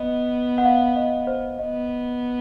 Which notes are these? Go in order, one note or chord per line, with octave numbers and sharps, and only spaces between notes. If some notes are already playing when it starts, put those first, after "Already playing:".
Already playing: B3 D#5
F#5
F5
D#5
C5
B3 D#5